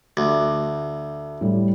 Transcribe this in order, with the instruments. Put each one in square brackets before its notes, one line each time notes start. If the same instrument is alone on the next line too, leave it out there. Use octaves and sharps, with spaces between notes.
[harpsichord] D2
[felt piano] A2 G3